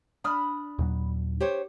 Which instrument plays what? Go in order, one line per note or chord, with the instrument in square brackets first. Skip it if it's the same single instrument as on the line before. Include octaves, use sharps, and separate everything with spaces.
[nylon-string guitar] D4 [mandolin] B5 D#6 F6
[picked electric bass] D#2 A#2 F#3
[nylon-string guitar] G4 C5 C#5